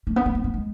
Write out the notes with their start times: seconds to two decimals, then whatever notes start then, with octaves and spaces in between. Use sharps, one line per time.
0.07 A3
0.16 B3
0.26 A3
0.35 B3
0.44 A3
0.54 G#3